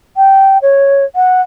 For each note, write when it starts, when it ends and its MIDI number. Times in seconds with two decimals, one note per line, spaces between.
0.17 0.58 79
0.62 1.05 73
1.15 1.41 78